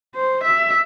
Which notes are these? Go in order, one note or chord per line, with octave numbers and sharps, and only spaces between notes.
C5
E5